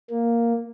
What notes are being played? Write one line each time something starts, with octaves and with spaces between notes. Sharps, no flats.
A#3